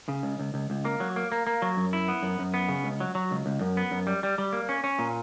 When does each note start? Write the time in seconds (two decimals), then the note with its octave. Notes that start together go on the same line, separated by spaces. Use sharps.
0.08 C#3
0.23 C#2
0.39 C#2
0.54 C#2
0.70 C#2
0.85 A#3
1.00 F#3
1.16 A#3
1.32 A#3
1.47 A#3
1.62 F#3
1.77 F#2
1.93 E4
2.08 B3
2.23 F#2
2.39 F#2
2.54 B3
2.69 C#3
2.84 C#2
3.00 F#3
3.15 F#3
3.31 C#2
3.46 C#2
3.61 F#2
3.77 B3
3.91 F#2
4.07 G3
4.23 G3
4.38 G3
4.53 A#3
4.69 C#4
4.84 C#4
4.99 A#2